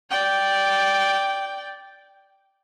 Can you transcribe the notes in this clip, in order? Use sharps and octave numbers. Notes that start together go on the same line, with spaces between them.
D5 G5